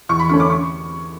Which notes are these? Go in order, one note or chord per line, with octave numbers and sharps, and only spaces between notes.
E2 C#6
B5
D3 A3 C#4 C#6
D6
C#6